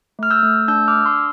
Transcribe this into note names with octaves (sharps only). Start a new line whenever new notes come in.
A3 F6
E6 G6
A3
D4 E6 G6
D6 F6
D4
C6 E6